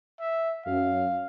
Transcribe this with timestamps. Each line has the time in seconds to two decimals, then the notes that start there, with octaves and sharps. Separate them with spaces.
0.20 E5
0.66 F#2 F5